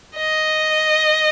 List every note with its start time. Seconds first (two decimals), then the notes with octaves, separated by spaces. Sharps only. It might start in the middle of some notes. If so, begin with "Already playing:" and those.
0.16 D#5